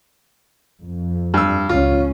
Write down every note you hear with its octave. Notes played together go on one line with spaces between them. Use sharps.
F2
G2 E6
C#2 C#4 F4